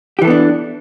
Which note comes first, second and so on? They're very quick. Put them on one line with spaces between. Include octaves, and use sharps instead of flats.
G4 E3 A4 B3 D4